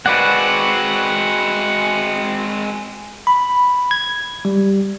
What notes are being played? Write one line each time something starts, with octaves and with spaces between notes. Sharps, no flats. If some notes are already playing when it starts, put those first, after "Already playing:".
G#3 C4 F#4 B4 D5 F#5
B5
G#6
G3